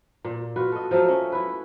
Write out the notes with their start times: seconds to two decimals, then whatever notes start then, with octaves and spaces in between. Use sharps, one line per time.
0.24 A#2
0.56 F4 F#4 B4
0.72 A4 D#5
0.91 F3 F#3 A3 E5
1.08 C#4
1.32 E4 B4